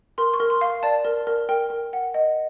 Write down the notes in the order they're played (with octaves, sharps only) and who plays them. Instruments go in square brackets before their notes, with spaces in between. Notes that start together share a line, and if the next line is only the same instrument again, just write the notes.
[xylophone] A#4 C6
C#6
A#4
C6
F5
D5 A5
A#4
A#4
A#4 G5
A#4
F#5
D#5